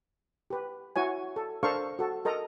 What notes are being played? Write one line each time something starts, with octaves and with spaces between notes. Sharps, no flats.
G4 B4
E4 F#4 C#5 G#5
A4
D4 A4 A#4 C5 F5 C#6
F#4 A4
A4 A#4 D#5 A#5